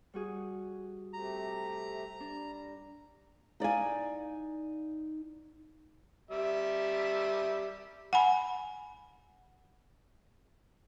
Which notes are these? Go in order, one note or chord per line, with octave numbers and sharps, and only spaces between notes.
G3 F#4 G#4
C3 A3 G4 A#5
G3 D4
D#4 D5 F5 G#5
G3 E5
F#5 G#5 B5